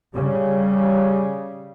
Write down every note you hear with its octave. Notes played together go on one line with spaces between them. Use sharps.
C#3 G3